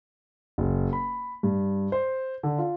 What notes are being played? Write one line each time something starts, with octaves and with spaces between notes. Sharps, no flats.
F#1
B5
G2
C5
D3
F4